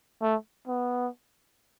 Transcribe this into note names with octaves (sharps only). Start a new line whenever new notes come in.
A3
B3